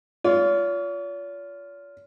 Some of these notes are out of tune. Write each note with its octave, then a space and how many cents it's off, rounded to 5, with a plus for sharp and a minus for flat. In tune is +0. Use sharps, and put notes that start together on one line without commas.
F4 +0 C#5 +45